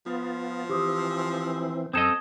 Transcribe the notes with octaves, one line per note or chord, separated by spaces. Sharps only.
F3 B3 F4
E3 C4 G4 D6 D#6
F#2 C4 A4 D#5 A#5 D#6 G#6 E7